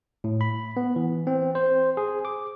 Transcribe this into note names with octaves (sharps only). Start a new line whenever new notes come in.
A2
B5
B3
E3
C4
C5
G#4
D6